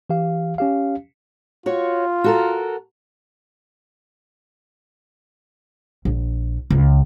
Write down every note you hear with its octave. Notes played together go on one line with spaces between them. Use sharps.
E3 G4 F5
C#4 G4 F5
F4 F#4 C#5
F#4 A4 A#4
A#1
C#2